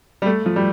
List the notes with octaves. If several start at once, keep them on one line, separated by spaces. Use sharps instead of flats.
G3
A3
F3
G3